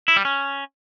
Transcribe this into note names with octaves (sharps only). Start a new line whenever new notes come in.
E4
G3
C#4